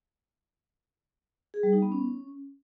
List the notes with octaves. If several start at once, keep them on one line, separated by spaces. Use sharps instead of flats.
G#4
G3
D#4
B3
C#4